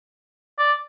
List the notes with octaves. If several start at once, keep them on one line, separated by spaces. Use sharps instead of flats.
D5